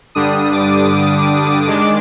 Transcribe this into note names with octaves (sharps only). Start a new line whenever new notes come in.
G2 D3 G3 D4 D#6
D6
D6
D#3 G#3 D4 D6